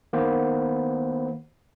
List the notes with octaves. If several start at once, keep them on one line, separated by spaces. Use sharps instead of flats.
D#3 A#3 B3 B4 C5